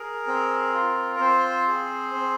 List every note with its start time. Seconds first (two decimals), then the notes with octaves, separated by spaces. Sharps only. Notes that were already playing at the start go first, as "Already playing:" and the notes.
Already playing: G#4 A#4
0.27 C4
0.73 F4
1.16 A#4
1.20 C4 C5
1.68 G#4
2.15 C4